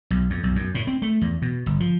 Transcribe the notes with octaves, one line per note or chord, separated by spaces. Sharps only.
B1
F2
B1
F#2
A2
C4
A3
E2
B2
G1
F3